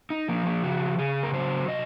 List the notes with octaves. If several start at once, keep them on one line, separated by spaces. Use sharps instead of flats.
D#4
F3 A#3
A#3
C#3 F#4
C#3 G#4
A#4
F#3 C5
C3 D#5